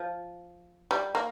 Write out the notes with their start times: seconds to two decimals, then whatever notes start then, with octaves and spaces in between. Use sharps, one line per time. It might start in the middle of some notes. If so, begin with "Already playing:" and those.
Already playing: F3
0.91 G3
1.15 A#3